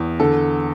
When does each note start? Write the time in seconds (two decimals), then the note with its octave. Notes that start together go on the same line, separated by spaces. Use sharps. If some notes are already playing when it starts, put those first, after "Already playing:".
Already playing: E2
0.20 D3 A4